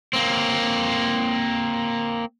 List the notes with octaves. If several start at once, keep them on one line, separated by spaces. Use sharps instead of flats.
A#3 C4